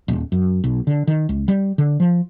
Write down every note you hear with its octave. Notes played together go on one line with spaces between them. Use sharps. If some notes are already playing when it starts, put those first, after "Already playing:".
D#1
F#2
B1
D3
D#3
C#2
G3
D3
F3